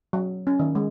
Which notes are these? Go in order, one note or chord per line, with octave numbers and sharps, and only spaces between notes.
F#3
C#4
D#3
G#3